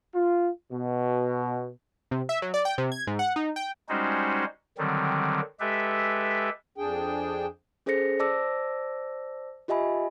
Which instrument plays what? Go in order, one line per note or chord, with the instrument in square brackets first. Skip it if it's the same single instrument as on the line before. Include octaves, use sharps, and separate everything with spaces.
[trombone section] F4
B2
[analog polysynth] C3
E5
F#3
D5
G5
C3
G#6
G#2
F#5
D#4
G5
[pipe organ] G3 G#3 C#4 D#4 F#4 C5
D3 D#3 F#3 G3 C4
G#3 G4 A4 B4 E5
[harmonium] F2 D4 G#4 G5
[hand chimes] C#4 G#4 A4 C5 A#6 C#7
C5 D5 A5 D6 E6 A#6
F4 G4 D#5 E5 G#5 B5